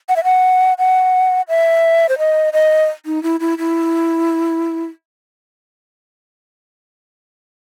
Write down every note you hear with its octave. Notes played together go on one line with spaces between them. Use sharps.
F#5
E5
F#5
F#5
E5
C5
D#5
D#5
D#4
E4
E4
E4